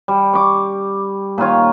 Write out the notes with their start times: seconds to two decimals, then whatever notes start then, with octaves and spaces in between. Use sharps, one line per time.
0.08 G3
0.33 C#6 D6
1.38 A#2 D#3 F4 C#5